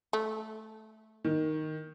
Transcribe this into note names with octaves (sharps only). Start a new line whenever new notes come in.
A3
D#3